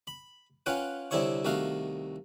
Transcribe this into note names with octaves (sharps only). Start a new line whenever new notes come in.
B5
C#4 F4 B4 F#5 G5
C2 D3 C4 E4 C#5 C#6
C2 D#3 A3 F#4 F5